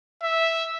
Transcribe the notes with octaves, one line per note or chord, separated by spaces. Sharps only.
E5